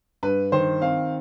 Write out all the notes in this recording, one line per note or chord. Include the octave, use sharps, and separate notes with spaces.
G2 B4
D#3 C5
C4 F5